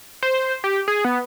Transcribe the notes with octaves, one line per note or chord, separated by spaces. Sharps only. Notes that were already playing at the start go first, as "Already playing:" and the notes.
C5
G4
G#4
B3